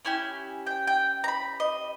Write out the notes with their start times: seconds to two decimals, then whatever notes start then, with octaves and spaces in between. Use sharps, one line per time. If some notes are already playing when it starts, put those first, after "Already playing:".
0.05 C#4 E4 G4 G#5
0.67 G5
0.87 G5
1.24 A#5
1.28 B5
1.60 D#5